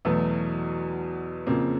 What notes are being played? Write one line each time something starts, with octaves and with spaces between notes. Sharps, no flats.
E2 B2 F#3 A3 B3
F2 C#3 F3 A#3 C4